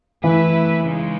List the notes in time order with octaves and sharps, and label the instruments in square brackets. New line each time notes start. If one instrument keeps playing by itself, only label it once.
[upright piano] E3 [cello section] A3 E4 B4 E5
[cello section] C#3 G#3 D#4